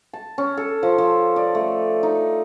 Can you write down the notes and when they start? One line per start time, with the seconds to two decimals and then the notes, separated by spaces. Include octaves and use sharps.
0.13 A5
0.38 C#4
0.57 A4
0.83 F3
0.98 F3
1.36 D5
1.55 A3
2.03 D#4